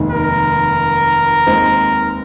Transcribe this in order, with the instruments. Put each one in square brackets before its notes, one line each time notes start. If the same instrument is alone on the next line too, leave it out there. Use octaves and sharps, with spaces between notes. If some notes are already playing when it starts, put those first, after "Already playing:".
Already playing: [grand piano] F1 D#2 D#3 G#3
[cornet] A#4
[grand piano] D#2 D#3 G#3 C4 D#4